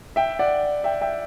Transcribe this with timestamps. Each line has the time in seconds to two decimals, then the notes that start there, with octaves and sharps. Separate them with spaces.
0.16 E5 G5
0.39 D5 F#5
0.84 E5 G5
1.01 E5 G5